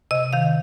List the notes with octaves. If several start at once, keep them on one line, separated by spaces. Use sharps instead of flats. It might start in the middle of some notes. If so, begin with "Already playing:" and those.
C3 D#5
D#3 F5